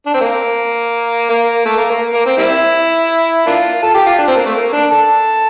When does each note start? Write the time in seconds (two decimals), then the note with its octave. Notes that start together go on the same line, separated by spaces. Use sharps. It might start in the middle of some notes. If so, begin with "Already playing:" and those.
0.06 D4
0.14 C4
0.21 A#3
1.29 A#3
1.66 A3
1.78 A#3
1.90 A#3
2.14 A#3
2.26 C4
2.38 G3 C4 E4
3.47 A#3 D4 F4
3.83 A4
3.95 G4
4.07 F4
4.19 D4
4.28 C4
4.37 A#3
4.46 A3
4.55 A#3
4.73 D4
4.91 A4